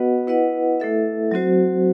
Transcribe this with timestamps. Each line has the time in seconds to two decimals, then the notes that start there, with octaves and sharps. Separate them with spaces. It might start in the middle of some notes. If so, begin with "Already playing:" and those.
Already playing: B3 F#4 B4 D#5 F#5
0.27 E4 B4 D#5 F#5
0.80 A3 E4 A4 E5
1.31 F#3 C4 F#4 C5